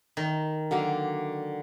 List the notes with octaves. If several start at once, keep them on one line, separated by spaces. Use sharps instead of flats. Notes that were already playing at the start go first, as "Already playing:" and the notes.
D#3
D3 F#3 A#3